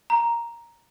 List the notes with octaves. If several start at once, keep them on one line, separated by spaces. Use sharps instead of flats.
A#5